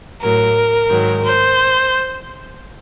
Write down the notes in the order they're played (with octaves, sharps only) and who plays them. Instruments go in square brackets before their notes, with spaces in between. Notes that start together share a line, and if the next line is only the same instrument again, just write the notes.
[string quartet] A2 F#3 A#4
G#2 D#3 F#3
C5